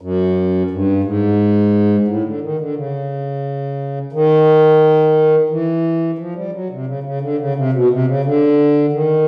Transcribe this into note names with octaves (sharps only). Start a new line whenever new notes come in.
F#2
G2
G#2
A2
D3
D#3
D3
C#3
D#3
E3
F3
G3
F#3
C3
C#3
C#3
D3
C#3
C3
B2
C3
C#3
D3
D#3